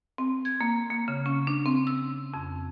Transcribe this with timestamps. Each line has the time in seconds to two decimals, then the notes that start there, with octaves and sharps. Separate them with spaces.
0.18 C4
0.45 G#6
0.61 A#3
0.90 A#3
1.08 C#3
1.26 C#4
1.47 D4
1.66 C4
1.87 E6
2.34 F2